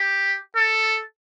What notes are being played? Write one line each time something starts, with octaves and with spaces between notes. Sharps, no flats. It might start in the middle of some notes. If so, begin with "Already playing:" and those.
Already playing: G4
A4